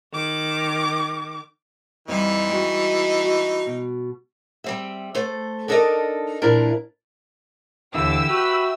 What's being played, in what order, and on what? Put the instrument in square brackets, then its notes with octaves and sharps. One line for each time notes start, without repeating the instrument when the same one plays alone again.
[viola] D#3 D6
[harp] F2 F3 G3 [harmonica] E3 D#4
[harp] G#3 F#4
F#4
B2
[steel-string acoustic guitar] G3 C4 E5
A3 A4 C5
D4 D#4 A4 A#4 D5 D#5
A#2 E3 F3 D4 E4 A#4
[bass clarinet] D#2 [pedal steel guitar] D3 E3 [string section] G4 E6 [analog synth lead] E5
[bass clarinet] F#4 [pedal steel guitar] B4